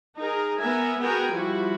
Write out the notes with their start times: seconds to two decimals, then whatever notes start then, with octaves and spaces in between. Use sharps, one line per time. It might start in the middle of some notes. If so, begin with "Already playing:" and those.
0.18 D#4 G#4 A#4
0.58 B3 A#4 E5 G#5
0.99 B3 F#4 G#4 A#4 G5 G#5
1.32 F3 G3 E4 F#4